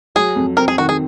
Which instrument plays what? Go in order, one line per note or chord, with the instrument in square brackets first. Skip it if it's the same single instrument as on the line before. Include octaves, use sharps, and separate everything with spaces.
[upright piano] F#3 [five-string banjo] G#4
[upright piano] F2
[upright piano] C4 [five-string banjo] A#4
[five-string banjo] G#4
[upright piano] D#3 [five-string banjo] F#4
[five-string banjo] G#4